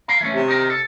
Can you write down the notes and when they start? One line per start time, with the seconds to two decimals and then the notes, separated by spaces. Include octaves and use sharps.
0.08 F5 A#5
0.21 E3 A3 C#4
0.33 C3
0.48 D#4 A#4
0.70 A4